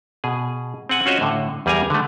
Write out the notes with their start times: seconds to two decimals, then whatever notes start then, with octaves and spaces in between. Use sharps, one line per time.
0.24 B2 G#4
0.89 C4 G#4 F#5 G#5
1.06 C#4 F4 F#4 C5 C#5 D#5
1.21 A2 D3
1.66 E2 G3 G#4 A#4 G#5 A#5
1.90 D3 A3